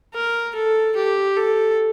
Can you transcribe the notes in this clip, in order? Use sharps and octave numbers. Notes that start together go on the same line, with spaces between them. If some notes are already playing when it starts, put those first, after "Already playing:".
A#4
A4
G4
A4